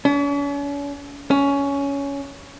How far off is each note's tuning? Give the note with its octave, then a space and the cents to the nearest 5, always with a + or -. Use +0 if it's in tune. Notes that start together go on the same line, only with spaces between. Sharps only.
C#4 +45
C#4 +15